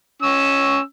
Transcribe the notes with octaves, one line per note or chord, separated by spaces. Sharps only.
C#4 E6